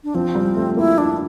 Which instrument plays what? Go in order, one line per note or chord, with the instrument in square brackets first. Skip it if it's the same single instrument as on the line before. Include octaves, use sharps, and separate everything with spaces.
[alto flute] D4
[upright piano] F3 [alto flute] C4
[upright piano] G3
A3
[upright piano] A#3 [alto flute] E4
[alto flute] D4 [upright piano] E4